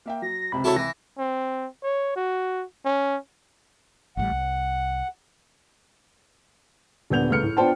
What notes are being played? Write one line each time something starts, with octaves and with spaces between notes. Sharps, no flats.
A#3 E5 G5
F#3 A#6
C#2 C3 C4 B5
E4 F#4 A4 C#5
E3 A#6
C4
C#5
F#4
C#4
A1 A2 G3 F#5
C2
D#1 D3 B3 G6 F7
C#2 A3 B4 F6 C#7
A2
B3 D4 F4 C5 G5 A5